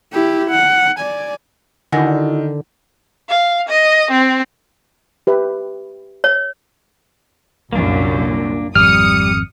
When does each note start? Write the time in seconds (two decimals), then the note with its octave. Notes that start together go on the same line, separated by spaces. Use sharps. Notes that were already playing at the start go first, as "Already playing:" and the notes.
0.13 E4 G4
0.50 F#5
1.00 D5 G#5
1.92 D3 D#3 E4 F#4 F#5 G#5 A#6
3.29 F5
3.68 D#5
4.11 C4
5.27 G4 B4 E5
6.24 C#5
7.73 C2 F#2 A#2 A#3 D4
8.75 G#1 F2 G3 D#6 F6 C#7